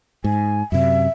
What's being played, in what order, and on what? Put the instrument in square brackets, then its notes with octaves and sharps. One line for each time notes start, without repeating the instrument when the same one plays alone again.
[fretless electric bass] G#2 [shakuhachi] G#5
[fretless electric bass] F#2 C3 [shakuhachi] E5